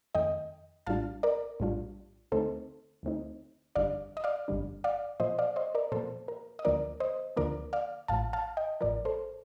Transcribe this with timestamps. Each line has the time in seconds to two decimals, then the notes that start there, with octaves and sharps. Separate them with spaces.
0.15 F2 D#3 A3 D#5 G5
0.87 A#1 A2 G3 D4 F4 F5 A5
1.23 A#4 D5
1.60 A#1 A2 G3 D4 F4
2.31 D2 D3 A3 C4 D#4 A4 C5
3.03 D2 D3 A3 C4 D#4
3.75 G1 F2 D3 G3 D4 D5 F5
4.17 D#5
4.24 D5 F5
4.48 G1 F2 D3 G3 D4
4.84 D5 F5
5.20 A#2 F3 A#3 C5 D#5
5.39 D5 F5
5.56 C5 D#5
5.75 A#4 D5
5.92 A#2 F3 A#3 A4 C5
6.28 A#4
6.59 D#5
6.65 D2 D3 F3 A#3 D4 A#4 D5
7.00 C5 D#5
7.37 D2 D3 F3 A#3 D4 A#4 D5
7.73 D5 F5
8.08 A1 A2 F3 F5 A5
8.33 F5 A5
8.57 D#5 G5
8.81 A1 A2 F3 A#4 D5
9.05 A4 C5